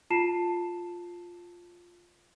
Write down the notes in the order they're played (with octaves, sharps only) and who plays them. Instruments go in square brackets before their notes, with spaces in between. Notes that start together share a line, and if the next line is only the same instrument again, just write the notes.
[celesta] F4 A5 C7 E7